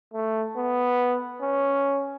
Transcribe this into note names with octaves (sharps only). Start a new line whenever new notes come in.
A3
B3
C#4